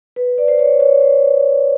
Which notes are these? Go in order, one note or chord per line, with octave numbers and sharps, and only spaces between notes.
B4
D5
C5
C#5
C#5
C5